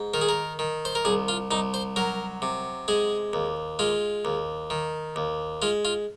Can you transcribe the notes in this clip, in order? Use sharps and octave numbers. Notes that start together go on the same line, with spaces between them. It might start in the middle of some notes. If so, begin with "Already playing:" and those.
Already playing: G#2
D#3 A#4
G#4
A#4
D#3
C5
A#4
C2 G#4
F4
C2 D#4
C5
F#3 A#4
C3
G#3 G#4
D#2
G#3 F4
D#2
D#3
D#2
G#3 F4
F4